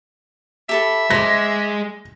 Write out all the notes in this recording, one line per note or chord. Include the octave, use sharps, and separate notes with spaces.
G4 A4 E5 B5
G#3 C5 D6 A#6